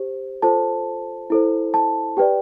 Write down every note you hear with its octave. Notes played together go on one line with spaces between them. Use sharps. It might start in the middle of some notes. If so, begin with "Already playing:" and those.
Already playing: G4 C5
F4 A4 C5 A5
E4 A4 C5
A5
G4 B4 D5 G5